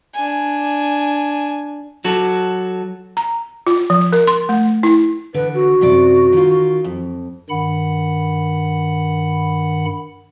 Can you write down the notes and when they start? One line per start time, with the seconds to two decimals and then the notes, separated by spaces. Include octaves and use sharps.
0.15 D4 G#5
2.05 F#3 F#4 A4
3.17 A#5
3.67 F4
3.90 F3
4.13 A#4
4.27 C6
4.49 A3
4.83 E4
5.34 D3 B4
5.54 F#4
5.81 F#2 C3 D5
6.32 D#3 F4
6.84 F2
7.50 G2 D#3 F#5 B5